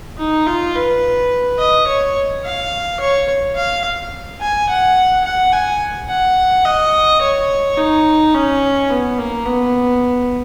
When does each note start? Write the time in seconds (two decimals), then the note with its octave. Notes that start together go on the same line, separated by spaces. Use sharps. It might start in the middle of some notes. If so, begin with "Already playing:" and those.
0.19 D#4
0.47 F4
0.75 B4
1.59 D#5
1.87 C#5
2.44 F5
3.00 C#5
3.56 F5
4.40 G#5
4.69 F#5
5.25 F#5
5.52 G#5
6.09 F#5
6.65 D#5
7.21 C#5
7.77 D#4
8.34 C#4
8.90 B3
9.18 A#3
9.45 B3